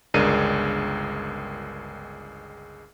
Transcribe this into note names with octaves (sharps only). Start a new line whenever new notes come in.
G1 C#2 G#3 D4 A#4 D#7